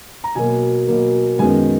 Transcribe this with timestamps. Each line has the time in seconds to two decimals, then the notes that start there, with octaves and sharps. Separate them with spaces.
0.24 A#5
0.35 B2 F#3 A#3 G#5
0.87 B2 F#3 A#3
1.39 F#2 D#3 G#3 B3 G#5